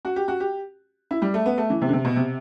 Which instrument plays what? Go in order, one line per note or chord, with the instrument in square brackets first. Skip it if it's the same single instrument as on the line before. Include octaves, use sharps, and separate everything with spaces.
[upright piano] F#4
G4
F#4
G4
E4
G3
A3
B3
A3
E3
C3
D3
C3
B2
C3